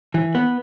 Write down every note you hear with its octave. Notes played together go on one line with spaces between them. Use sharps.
E3
B3